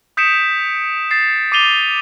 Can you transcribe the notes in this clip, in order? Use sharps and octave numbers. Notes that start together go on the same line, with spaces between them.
D#6 G6 B6 C#7 D7 E7
A6 C7
D6 A6 C7 D#7 F7 G7